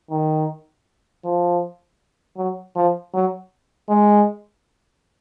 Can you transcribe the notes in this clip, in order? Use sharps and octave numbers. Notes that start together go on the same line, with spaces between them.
D#3
F3
F#3
F3
F#3
G#3